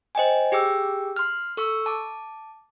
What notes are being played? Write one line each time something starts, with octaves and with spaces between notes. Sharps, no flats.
C5 D#5 G5 G#5
G4 G#4 G5 D6 E6
C6 F6
A4 C#6 E6
A5 D6